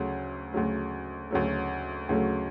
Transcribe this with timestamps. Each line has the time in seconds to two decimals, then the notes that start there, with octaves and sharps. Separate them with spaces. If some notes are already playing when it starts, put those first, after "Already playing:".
Already playing: D2 C#3 F#3 A3
0.52 D2 C#3 F#3 A3
1.31 D2 C#3 F#3 A3
2.09 D2 C#3 F#3 A3